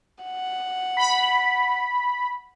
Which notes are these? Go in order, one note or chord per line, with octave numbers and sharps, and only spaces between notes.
F#5
B5